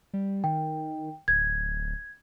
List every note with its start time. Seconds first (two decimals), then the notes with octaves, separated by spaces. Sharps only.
0.13 G3
0.44 D#3 G5
1.28 D1 G#6